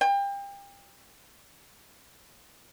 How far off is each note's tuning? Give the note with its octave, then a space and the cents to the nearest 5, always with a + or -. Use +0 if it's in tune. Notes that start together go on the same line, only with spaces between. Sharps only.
G5 +30